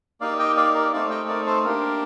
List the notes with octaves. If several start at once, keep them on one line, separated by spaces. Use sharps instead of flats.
A#3 D#4 G4 D5 F5
D#5 G5
D5 F5
A#4 D5
A3 C4 D#4 D5 F5
D#5 G5
A#4 D5
A4 C5
A#3 D4 G4 A#4